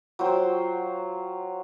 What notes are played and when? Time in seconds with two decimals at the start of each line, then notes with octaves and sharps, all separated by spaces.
0.19 F#3 F4 C5 G5